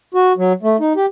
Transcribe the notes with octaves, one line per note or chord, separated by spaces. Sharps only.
F#4
F#3
A3
D#4
G4